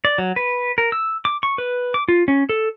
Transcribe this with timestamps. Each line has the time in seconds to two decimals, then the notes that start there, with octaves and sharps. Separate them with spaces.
0.05 D5
0.18 F#3
0.36 B4
0.78 A#4
0.92 E6
1.25 D6
1.43 C#6
1.58 B4
1.94 D6
2.08 F4
2.28 C#4
2.49 A4